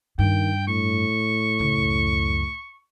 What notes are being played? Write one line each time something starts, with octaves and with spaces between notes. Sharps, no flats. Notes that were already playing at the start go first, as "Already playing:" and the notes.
G2 D#3 G5
A2 C#6
C#2 F#2